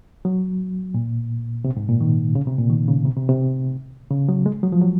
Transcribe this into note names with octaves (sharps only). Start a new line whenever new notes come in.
F#3
A#2
C3
G#2
A#2
D#3
C#3
C3
A#2
D#3
C#3
C3
C3
C3
C#3
F#3
G#3
F#3
F3
F#3